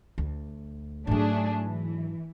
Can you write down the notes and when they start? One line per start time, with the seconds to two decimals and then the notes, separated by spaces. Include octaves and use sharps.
0.18 D2
1.07 G#2 F#3 A3 D4 G#4
1.60 E3